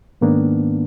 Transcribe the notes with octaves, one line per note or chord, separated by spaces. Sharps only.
G#2 D#3 A#3 B3 D4